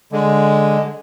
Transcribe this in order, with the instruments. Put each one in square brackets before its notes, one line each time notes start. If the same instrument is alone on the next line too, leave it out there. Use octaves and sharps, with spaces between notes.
[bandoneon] D3 G#3